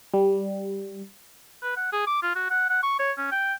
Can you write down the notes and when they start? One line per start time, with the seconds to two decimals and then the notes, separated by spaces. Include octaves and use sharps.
0.14 G3
1.62 B4
1.77 F#5
1.92 G#4
2.07 D6
2.23 F4
2.35 F#4
2.50 F#5
2.70 F#5
2.83 C#6
2.99 C#5
3.18 C#4
3.32 G5